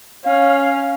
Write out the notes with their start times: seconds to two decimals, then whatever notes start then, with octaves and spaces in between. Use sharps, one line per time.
0.25 C#4 F5